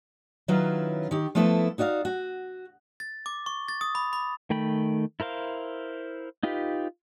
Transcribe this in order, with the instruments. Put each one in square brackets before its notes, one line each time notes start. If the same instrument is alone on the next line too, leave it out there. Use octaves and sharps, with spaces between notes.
[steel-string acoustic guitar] D#3 F#3 C#4 E4 F4 B4
D#3 G4
F3 A3 B3 E4 A4 B4
D#4 F#4 D5 D#5 F5
F#4
[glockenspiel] A6
D6
C#6
A6
D#6
B5
B5
[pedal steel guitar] D#3 A3 G5 B5
E4 A#4 C5 F5
D#4 F4 G4 B4